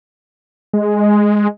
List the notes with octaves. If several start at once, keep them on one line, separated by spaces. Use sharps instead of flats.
G#3